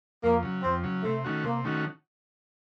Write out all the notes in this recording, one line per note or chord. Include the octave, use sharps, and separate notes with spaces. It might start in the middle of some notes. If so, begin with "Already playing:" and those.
F2 A#3
C#3 F#3
F2 C4
C#3 F#3
C3 A3
D#3 A3 C#4 F#4
C3 A#3
D#3 A3 C#4 F#4